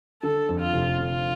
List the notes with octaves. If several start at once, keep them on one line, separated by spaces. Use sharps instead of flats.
D3 A4
F2
F4
F1
D3 F4